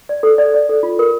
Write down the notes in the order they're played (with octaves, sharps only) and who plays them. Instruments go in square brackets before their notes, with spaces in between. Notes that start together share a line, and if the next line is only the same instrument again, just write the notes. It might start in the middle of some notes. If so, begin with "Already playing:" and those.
[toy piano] D5
A4
D5
D5
A4
F4
A#4